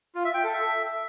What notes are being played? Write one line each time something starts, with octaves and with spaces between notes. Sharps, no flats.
F4
E5
G5
A4
E5